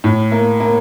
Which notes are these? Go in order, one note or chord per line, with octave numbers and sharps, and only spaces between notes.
A2
A#3
A#3